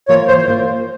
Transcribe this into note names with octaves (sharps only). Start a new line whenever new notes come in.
E3 A#3 F4 C5 C#5
E3 C5
A#3 F4